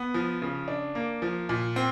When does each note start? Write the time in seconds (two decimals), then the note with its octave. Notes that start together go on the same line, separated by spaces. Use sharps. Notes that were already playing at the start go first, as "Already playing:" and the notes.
Already playing: B3
0.14 F3
0.42 C#3
0.68 D4
0.95 A#3
1.22 F3
1.49 A#2
1.76 C4